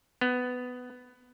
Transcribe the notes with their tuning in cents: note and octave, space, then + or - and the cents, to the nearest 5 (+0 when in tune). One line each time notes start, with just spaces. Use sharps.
B3 +10